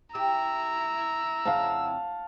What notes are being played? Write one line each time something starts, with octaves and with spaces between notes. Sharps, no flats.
E4 G4 A#5 E6
F2 C#3 F5 F#5 A5